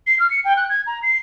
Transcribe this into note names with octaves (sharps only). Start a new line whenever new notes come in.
C7
F6
C#7
G5
F#6
G#6
A#5
C7